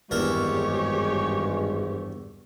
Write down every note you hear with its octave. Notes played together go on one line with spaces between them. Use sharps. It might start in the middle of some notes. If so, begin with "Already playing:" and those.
G#1 E2 G2 G#3 E4 G4 A#4 C#5